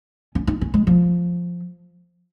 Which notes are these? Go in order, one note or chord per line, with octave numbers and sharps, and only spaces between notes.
C#4
D#4
C#4
G#3
F3